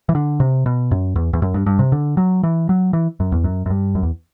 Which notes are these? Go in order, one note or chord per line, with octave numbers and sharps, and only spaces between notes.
E3
D3
C3
B2
F#2
E2
E2
F#2
G2
G2
C3
D3
F#3
E3
F#3
E3
F#2
E2
F#2
F#2
G2
F#2
E2